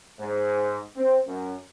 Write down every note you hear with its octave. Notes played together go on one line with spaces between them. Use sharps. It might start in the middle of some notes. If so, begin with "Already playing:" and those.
G#2
C4
F#2